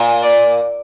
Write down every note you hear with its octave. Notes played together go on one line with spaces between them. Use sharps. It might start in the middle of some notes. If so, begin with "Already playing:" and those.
Already playing: A#2
D5